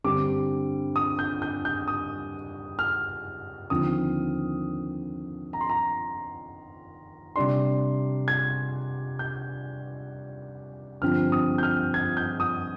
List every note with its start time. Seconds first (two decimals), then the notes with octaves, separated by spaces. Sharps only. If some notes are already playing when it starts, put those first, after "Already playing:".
0.04 G2 D3 G3 C4 D6
0.96 D#6
1.19 G6
1.42 G6
1.65 G6
1.88 D#6
2.79 F6
3.70 D#2 D3 F3 C4 D#6
5.53 A#5
5.61 C6
5.69 A#5
7.36 C3 G3 D4 C6
8.28 G#6
9.19 G6
11.02 G2 D3 F3 C4 F6
11.32 D#6
11.58 G6
11.63 F6
11.94 G#6
12.17 G6
12.40 D#6